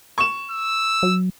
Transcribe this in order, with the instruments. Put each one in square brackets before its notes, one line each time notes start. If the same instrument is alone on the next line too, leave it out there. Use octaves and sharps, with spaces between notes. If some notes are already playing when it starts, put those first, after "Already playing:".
[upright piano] C#6 E7
[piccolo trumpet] E6
[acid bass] F#3